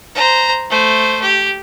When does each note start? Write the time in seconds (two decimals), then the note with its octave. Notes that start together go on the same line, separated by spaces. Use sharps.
0.15 C5 A#5
0.70 A3 C5
1.22 G4